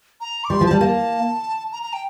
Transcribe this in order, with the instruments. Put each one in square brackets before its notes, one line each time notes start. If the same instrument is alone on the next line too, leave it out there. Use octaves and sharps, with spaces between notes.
[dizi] A#5
D6
[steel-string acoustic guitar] G3 [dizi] C6
[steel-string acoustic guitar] F3
[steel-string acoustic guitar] G3 [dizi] A5
[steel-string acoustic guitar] A#3 [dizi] A5
[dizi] A#5
A#5
G5